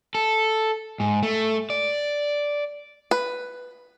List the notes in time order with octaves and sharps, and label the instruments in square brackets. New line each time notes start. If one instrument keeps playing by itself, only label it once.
[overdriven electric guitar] A4
G#2
A3
D5
[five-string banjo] B4